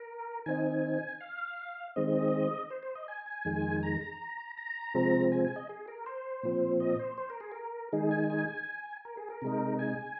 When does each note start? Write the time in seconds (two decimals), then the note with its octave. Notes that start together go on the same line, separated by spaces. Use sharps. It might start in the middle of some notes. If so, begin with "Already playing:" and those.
Already playing: A#4
0.46 D#3 C4 D#4 G#5
1.21 F5
1.96 D#3 G#3 C4 D#5
2.70 C5
2.83 C5
2.95 D#5
3.08 G#5
3.26 G#5
3.45 F2 D#3 G#3
3.83 A#5
4.01 A#5
4.57 A#5
4.94 C3 F3 G#3 C4
5.32 G#5
5.45 G#5
5.56 D#5
5.69 G#4
5.88 A#4
6.06 C5
6.43 A#2 F3 C4
6.80 D#5
6.99 C5
7.18 C5
7.30 A#4
7.40 G#4
7.52 A#4
7.92 D#3 G#3 D#4 G#4
8.11 G#5
8.30 G#5
9.05 A#4
9.17 G#4
9.30 A#4
9.42 C3 G#3 D#4
9.79 G#5